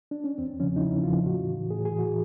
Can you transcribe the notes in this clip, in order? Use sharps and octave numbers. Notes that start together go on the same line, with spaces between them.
D4
C#4
E2 C4
C#3 F3 C#4
D#4
E2 E4
C#3 F3 F4
A2 F#4
E3
A2 G#4
G#4
E3
F#4